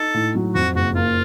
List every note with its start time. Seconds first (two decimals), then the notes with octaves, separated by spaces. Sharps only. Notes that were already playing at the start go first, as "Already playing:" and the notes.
Already playing: D#4 A4
0.14 A2
0.35 F#3
0.55 F2 F#4
0.75 F#1 F#4
0.95 A#3 F4